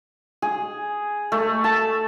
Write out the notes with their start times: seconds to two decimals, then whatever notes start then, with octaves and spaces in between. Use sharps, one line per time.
0.42 G#4
1.32 A3
1.64 A5